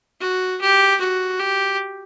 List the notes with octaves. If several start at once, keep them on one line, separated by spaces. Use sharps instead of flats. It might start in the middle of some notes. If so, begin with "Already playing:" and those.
F#4
G4
F#4
G4